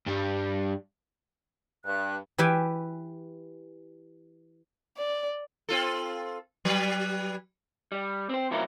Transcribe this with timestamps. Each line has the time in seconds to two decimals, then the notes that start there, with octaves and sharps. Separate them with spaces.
0.06 G2 G3
1.85 G2 F#6
2.38 E3 G4 B4 E5 G5 G#5
4.97 D5
5.69 C4 F4 A4
6.65 F#3 G3 B4
7.92 G3
8.29 C4 C5
8.51 A2 C3 F#3 E4 F4 A#4